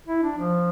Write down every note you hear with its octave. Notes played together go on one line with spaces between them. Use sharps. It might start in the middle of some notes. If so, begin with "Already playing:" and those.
E4
D4
F3